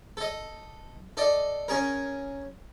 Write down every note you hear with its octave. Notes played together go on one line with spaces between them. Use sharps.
A4 D#5
A4 D5 D#5
C#4 G#4 A#4